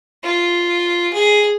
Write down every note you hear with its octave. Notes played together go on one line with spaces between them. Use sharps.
F4
G#4